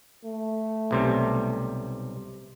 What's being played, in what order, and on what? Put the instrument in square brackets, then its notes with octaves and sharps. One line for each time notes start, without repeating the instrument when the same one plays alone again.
[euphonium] A3
[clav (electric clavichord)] B1 C3 G3